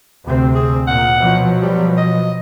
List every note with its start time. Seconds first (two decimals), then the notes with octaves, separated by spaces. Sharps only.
0.25 D2 C3 C4
0.55 G#4
0.88 A#2 F#5
1.19 B2 F3 F#3
1.62 G3
1.97 D#5